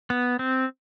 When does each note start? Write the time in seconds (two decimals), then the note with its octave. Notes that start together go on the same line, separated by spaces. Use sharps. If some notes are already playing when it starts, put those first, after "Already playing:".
0.10 B3
0.39 C4